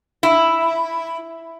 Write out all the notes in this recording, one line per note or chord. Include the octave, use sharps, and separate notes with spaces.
E4